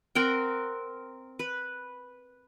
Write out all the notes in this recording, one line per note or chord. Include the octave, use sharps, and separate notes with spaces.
C4 A#4 F#5 G5
B4